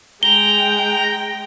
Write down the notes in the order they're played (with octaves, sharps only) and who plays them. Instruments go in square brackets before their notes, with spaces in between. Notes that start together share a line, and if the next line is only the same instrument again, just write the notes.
[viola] G#3 G5 [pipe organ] A#5 [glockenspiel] G7